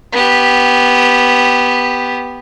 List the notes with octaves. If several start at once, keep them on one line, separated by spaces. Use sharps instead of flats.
B3 G4